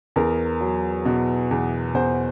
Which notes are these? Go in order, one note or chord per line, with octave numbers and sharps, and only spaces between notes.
E2 A#4
F#3
B2
E2
E2 C5